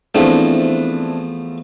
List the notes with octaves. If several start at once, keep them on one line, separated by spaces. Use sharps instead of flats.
E2 F3 A3 C4 D4 E4